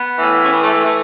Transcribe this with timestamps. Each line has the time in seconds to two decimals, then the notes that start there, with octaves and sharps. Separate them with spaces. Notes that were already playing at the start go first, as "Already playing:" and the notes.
Already playing: B3
0.18 A2 E3
0.45 C#4
0.52 B3
0.64 A3
0.74 A3
0.85 E3 A3